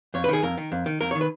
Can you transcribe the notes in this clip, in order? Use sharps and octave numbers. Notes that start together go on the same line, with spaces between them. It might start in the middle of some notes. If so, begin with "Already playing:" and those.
F2 C#5
B4
D#3 G#4
F2 A#4
D#3
F2
D#3
F2 A#4
C#5
D#3
B4